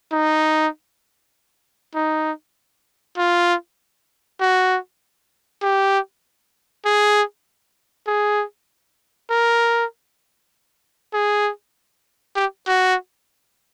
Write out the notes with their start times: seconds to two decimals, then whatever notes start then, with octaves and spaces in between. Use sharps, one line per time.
0.12 D#4
1.95 D#4
3.18 F4
4.41 F#4
5.62 G4
6.85 G#4
8.07 G#4
9.30 A#4
11.14 G#4
12.36 G4
12.68 F#4